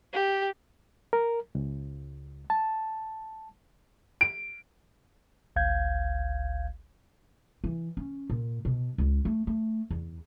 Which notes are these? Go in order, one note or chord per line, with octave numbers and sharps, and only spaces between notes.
G4
A#4
C#2
A5
D7
G1 C#2 F5 G6 G#6
E3
C#4
A#2
B2
C#2
A3
A3
E2